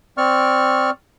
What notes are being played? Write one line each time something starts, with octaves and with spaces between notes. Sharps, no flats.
C4 D5 C#6 F6